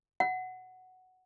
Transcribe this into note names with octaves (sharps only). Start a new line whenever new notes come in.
F#5